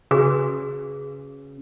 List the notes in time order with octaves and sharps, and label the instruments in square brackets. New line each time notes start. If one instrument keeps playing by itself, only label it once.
[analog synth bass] C#3 [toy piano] F#4 G#4 B4